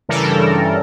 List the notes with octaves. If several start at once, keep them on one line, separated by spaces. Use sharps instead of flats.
G2 C#3 E3 G3 A4 A#4